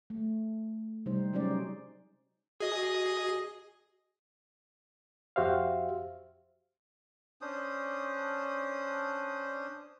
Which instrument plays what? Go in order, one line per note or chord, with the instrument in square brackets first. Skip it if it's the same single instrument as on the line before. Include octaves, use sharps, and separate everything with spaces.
[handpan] A3
C3 G3 D#4 C5
F#3 G#3 C#4 D#4 C5 D5
[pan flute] F#4 [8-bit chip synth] G#4 D#5 D#6
[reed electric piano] F2 F#4 G4 C5 E5 F5
[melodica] C#4 D4 C5 D#6